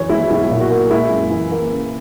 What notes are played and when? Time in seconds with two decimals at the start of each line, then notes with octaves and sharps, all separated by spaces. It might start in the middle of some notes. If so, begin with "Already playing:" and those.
Already playing: F#2 E3 F#3 C#5
0.09 G#3 E4
0.30 B1 E4
0.50 A#2
0.61 F#4
0.70 A#3
0.90 G#3 E4
1.11 F#2
1.30 E3
1.51 A#3
1.71 C#3